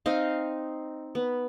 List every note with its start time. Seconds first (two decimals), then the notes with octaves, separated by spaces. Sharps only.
0.06 C4 D#4 D#5 F5
1.15 B3